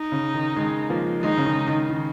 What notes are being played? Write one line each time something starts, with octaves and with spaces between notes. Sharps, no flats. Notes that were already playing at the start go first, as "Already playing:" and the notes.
Already playing: D#4
C#3
D#3
D#3 G#3
F3 A#3
D#3 G#3 D#4
C#3
D#3
D#3
D#3